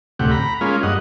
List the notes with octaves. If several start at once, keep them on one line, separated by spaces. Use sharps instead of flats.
D2 A2 C3 G4 F#5
A#5 B5
G#3 A#3 C#4 F4
G2 D#5 F#5